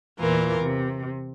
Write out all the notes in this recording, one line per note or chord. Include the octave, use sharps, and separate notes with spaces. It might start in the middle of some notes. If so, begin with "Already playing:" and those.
E2 A#2 E3 F4 A#4
C3